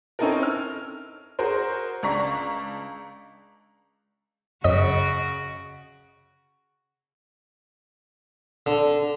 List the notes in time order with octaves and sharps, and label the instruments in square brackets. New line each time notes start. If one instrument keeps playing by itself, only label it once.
[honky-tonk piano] C4 C#4 D#4 E4 A4 A#4
F6
F#4 G#4 A#4 C5
C#2 D4 A#5 C#6 B6
[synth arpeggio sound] F#2 D#5 B6 [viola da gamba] C#3 F#4
[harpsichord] D3